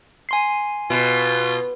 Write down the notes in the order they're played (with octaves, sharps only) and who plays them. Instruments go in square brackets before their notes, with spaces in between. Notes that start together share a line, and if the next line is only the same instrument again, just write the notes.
[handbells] G#5 C6 C7
[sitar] B2 [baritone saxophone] F4